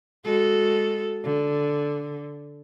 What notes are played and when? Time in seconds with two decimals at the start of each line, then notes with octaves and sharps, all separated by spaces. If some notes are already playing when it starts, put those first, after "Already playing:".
0.25 G#3 F#4 A4
1.24 D3